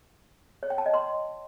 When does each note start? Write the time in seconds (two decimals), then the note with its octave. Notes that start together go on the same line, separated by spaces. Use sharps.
0.63 C#5
0.70 G5
0.78 A5
0.86 D#5
0.94 C6